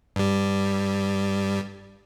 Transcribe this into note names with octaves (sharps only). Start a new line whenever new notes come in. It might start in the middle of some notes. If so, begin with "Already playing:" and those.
G2 G3